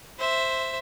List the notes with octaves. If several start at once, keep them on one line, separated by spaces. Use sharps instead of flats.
C5 E5